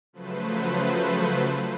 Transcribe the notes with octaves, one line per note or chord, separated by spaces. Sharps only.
C#3 F3 F#3 A3 B4 C5